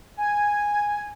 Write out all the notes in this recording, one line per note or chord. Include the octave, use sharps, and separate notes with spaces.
G#5